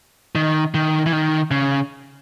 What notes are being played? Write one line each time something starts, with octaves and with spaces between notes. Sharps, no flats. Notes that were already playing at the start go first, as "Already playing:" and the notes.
D#3
D#3
E3
D#3
C#3